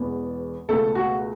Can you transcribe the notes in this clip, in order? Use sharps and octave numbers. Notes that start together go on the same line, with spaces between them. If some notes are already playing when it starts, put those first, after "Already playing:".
Already playing: E1 E2 B2 B3
C#2 B2 A3 A4
F#4